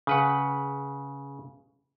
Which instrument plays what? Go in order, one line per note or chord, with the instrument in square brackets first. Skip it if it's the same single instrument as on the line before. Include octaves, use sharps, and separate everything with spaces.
[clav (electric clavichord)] C#3 B4 F#5